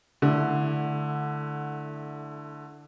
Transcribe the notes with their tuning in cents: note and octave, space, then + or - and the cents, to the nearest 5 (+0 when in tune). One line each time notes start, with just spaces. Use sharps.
D3 +0 A3 -25 E4 +0